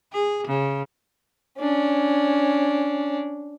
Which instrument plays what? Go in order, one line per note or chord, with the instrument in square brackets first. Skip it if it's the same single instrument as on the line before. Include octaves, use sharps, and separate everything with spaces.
[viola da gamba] G#4
C#3
[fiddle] C#4 D4